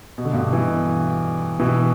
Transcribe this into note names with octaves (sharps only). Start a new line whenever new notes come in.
B2
D3
G2 B2
B2 E3
B2 E3